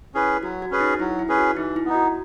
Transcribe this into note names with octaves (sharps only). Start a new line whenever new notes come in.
C#4 E4 G#4 B4
F#3 F#4
F#4
C#4 G#4 B4
D#4
F#3 E4
E4
C#4 G#4 B4
F#4
E3 D#4
E4
B3 D#4
F#4